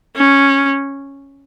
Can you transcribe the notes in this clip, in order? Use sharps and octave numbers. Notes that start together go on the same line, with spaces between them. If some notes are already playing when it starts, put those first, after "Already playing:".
C#4